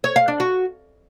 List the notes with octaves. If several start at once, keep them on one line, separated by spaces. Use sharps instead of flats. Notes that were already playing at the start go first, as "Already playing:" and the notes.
C#5
F5
D4
F#4